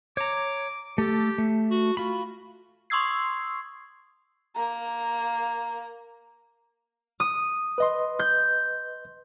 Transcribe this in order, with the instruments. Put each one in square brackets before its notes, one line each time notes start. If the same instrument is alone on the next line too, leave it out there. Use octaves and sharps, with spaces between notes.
[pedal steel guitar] C#5 A#5 [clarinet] D6
[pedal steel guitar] A3 A4 [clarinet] G4
[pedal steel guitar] A3
[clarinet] F#4
[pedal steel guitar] F4 B5 [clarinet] F#4
[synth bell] C6 C#6 D#6 E6 G#6 C7
[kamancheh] A#3 A#5
[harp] D#6
[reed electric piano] B4 D#5 C6
[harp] G6